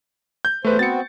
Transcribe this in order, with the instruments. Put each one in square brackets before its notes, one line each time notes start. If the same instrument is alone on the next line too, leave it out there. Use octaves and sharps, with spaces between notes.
[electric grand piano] G6
[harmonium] E2 C5 [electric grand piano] A3 B4
[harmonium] B3 C4 F#4 [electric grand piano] A6 C#7